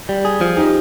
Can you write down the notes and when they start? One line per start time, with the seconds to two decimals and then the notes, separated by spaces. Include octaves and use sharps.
0.09 G3
0.25 G#4
0.41 F3
0.57 D#4 G4